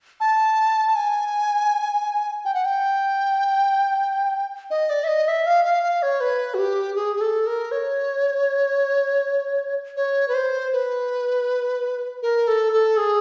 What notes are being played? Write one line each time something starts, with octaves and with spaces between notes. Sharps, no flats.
A5
A5
G#5
G5
F#5
G5
D#5
D5
E5
D#5
E5
F5
F5
F5
C#5
B4
F#4
G4
G#4
G#4
A4
A#4
C#5
C#5
B4
C5
B4
A#4
A4
A4
G#4